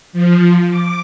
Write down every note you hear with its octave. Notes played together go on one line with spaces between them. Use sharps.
F3
D6